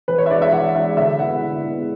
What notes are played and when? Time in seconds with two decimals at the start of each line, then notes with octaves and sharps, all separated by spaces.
0.08 E3 B4
0.18 C#5
0.26 E5
0.30 G#3 D4 D5
0.42 E5
0.52 E3 F#5
0.74 G#3 D4 E5
0.97 D3 E5
1.19 G#3 B3 E4 F#5
1.42 D3
1.63 G#3 B3 E4